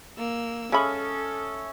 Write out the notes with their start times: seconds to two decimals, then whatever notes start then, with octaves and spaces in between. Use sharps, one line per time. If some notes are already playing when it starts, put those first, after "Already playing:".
0.18 A#3 E6
0.72 G#3 C#4 A4 E5 B5 D#6